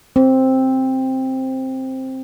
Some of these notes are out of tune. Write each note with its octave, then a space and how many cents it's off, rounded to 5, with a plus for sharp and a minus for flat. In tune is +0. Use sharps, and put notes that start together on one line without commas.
C4 +5